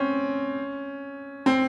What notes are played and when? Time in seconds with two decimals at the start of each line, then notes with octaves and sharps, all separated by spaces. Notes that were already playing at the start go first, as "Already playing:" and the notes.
Already playing: C4 C#4
1.46 C4